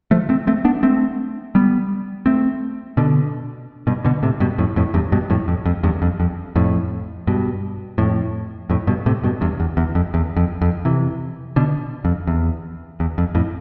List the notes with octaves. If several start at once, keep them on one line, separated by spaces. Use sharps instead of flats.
F3 A3
A3 C4
A3 C4
B3 D4
A3 C4
G3 B3
A3 C4
B2 D3
G2 B2
B2 D3
A2 C3
G2 B2
F2 A2
F2 A2
E2 G2
G2 B2
F2 A2
F2
F2
E2 G2
F2
F2
F2 A2
G2 B2
F2 A2
F2 A2
G2 B2
A2 C3
G2 B2
E2 G2
E2
E2
F2
E2
F2
F2
C3 E3
B2 D3
F2
E2
E2
F2
F2 A2